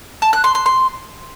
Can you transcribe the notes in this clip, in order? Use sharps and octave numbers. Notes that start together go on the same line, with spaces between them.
A5
F#6
C6
C6
C6